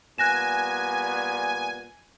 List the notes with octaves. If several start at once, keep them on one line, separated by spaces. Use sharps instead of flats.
A#2 G3 B3 G#5 F#6 A#6 E7